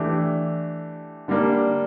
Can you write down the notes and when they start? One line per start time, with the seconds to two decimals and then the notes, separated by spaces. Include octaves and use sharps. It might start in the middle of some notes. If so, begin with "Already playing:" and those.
Already playing: E3 A3 D4 G4
1.28 D3 G3 A#3 D4